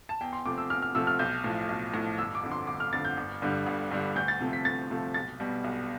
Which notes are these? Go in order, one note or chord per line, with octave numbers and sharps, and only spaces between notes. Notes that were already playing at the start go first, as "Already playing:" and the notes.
A5
E2 G5
C6
C3 F3 A3 D6
E6
E2 F6
F6
C3 F3 A3 E6
F6
B1 G6
A2 F3
B1
A2 F3
G1 E6
D6
F2 D3
C6
G1 D6
F6
F2 D3 A6
G6
G1
G2 D3 G3
G1
G2 D3 G3
D2 G6
A6
C3 F3 A3
B6
D2 A6
C3 F3 A3
B1 A6
B2 G3
B1